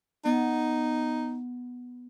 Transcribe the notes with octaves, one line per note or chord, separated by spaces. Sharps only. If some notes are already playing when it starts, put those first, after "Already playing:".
B3 D#4